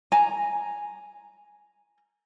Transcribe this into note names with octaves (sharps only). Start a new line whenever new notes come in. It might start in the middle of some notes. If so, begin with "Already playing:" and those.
G#5 A#5